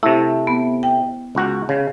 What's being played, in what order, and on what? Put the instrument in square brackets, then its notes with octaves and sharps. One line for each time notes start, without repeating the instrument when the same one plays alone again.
[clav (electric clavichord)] C3 A3 [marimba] E4
[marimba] B3
G5
[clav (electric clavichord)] C#2 F#4
C#3